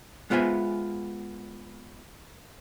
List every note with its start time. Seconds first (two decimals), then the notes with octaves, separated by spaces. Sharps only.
0.30 G#3 B3 F4 C5 E5 G#5